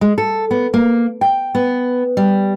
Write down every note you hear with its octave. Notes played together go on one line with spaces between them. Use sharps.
G#3
A4
B3
A#3
G5
B3
G3